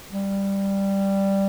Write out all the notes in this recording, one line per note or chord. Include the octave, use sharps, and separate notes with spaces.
G3